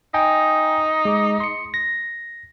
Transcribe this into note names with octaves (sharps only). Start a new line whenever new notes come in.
D#4 G5 G#5
G#3 D6
C6 C#7
A#6